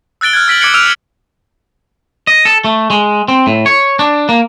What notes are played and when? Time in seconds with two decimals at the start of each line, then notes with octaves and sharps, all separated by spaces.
0.21 E6 F#6 A6 D7 G7
0.33 F6 F#6 G#6
0.48 E6 B6 D7 F#7
0.61 D6 G#6 A6 C#7 D7 F#7
0.74 E6 F6 D7 D#7 F7
2.27 D#5
2.45 A4
2.64 A3
2.90 G#3
3.28 C4
3.47 A2
3.66 C#5
3.99 D4
4.29 A#3